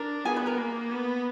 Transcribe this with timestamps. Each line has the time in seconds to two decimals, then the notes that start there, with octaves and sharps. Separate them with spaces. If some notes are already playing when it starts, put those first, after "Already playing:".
Already playing: D4 A#4 A#5
0.25 B3 G#4 G#5
0.36 B4 B5
0.46 A#4 A#5
0.58 A#3
0.91 B3